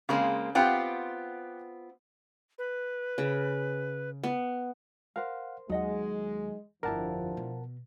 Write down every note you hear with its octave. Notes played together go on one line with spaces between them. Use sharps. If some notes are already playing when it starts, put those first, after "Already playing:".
C#3 G#3 A#3 C4
B3 C4 F4 G4 F#5 G5
B4
C#3
B3
A#4 C5 F5 F#5
D#2 F#3 G#3 D#4 D#5 F#5
G1 F2 F3 D4 E4 A#4 F#5 A5
B2